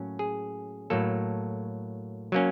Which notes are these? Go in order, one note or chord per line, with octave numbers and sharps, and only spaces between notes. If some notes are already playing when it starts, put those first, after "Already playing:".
Already playing: A2 F#3 A#3 C#4
G#4
A2 F#3 A#3 A4
F#3 A#3 C#4